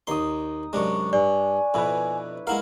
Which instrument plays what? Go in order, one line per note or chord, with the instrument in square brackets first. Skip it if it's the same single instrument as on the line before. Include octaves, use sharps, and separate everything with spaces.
[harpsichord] D#2 C6 [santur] D#4 D#6
[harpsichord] F#2 C3 G#3 [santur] D4 C#5
[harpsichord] G2 [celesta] D5 [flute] G#5
[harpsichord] F2 B2 [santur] E4 B4
[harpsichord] G#3 E4 F5 [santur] A#4 [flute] F#5